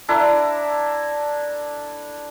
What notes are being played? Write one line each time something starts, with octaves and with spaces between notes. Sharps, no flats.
D4 E4 A4 A#5